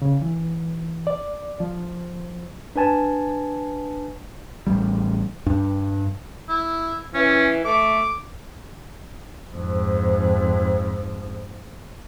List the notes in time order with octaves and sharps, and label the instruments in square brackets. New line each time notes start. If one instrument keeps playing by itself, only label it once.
[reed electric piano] C#3
E3
D5
F3
[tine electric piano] D4 B4 G#5 A5
[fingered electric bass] A1 G3
G2 D4
[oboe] E4
[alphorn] E3 [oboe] C#4
[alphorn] A3 [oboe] D6
[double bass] F2 G#2